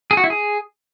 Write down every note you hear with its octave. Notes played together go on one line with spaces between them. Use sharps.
G#4
F#4
E4
G#4